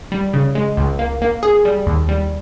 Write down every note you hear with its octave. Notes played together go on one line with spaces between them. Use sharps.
G3
C#3
G#3
C#2
A#3
A#3
G#4
G3
D#2
G3